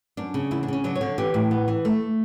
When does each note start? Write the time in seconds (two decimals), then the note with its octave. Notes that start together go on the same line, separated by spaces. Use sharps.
0.17 F#2 D4
0.34 C#3
0.51 E2 E4
0.63 D4
0.68 C#3 C#4
0.84 F#3 D4
0.95 C#5
1.01 D3
1.18 E3 G4
1.34 A2
1.51 B3
1.68 E3
1.85 A3